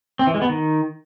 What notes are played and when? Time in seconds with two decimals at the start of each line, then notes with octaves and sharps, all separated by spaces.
0.19 C4
0.27 E3
0.34 G#3
0.42 B3
0.49 D#3